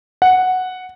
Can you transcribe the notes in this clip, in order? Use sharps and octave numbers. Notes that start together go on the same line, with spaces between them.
F#5